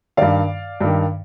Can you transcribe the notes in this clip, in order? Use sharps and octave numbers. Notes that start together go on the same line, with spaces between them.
G2 D#3 D5 F5
G2 D#3